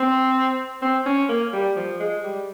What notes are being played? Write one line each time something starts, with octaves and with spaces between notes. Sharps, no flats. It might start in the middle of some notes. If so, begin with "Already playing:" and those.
Already playing: C4
C4
C#4
A#3
G3
F3
G#3
G3